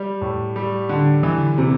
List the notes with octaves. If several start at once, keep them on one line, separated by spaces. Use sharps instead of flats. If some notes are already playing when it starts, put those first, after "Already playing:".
Already playing: G3
A2
G3
D3
E3
C3